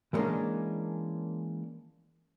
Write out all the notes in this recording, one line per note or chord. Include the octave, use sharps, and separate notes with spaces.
E3 G3 G#3 A#3 C#4 D4